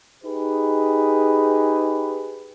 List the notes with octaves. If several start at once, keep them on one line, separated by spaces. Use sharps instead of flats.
D#4 G4 G#4 B4